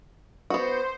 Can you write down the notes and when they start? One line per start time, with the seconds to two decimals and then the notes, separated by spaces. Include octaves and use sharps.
0.50 B3 F#4 C5